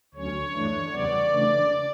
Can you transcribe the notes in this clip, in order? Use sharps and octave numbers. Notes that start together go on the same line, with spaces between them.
D2 D3 F#3 C#4 C#5
G2 E3 A3 D4
E2 C#3 G3 B3 D5
C#3 E3 A3 D4